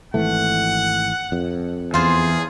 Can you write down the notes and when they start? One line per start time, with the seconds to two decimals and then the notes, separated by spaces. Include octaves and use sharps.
0.14 G#1 E3 A3 F#5
1.32 F2
1.94 E2 F4 G#4 C5